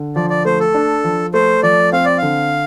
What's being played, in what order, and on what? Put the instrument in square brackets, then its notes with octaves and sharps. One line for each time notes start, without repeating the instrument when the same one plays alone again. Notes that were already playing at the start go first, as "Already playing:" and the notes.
Already playing: [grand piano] D3
[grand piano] F3 [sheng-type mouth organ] D5
[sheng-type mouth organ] D5
[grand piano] A3 [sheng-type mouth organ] C5
[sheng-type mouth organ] A4
[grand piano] D4
F3
[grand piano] A3 [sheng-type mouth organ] C5
[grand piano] F3 [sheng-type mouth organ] D5
[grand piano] C4 [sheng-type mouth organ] F5
[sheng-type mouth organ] D5
[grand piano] D3 [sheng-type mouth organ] F5